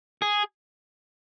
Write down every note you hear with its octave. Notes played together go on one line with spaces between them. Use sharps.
G#4